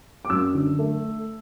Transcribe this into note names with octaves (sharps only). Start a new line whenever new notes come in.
D6
F#2 E6
D3
A3